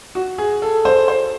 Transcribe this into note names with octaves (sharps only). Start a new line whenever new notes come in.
F#4
G#4
A4
C5
C5